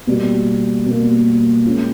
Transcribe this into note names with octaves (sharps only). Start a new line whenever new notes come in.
B2 G3 A#3
B2 G3 A#3
G#3 C#4 F4